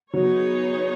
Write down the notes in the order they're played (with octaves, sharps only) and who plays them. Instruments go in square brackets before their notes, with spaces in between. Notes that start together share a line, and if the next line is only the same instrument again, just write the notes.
[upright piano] F#3 [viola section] B3 D#4 G#4 C#5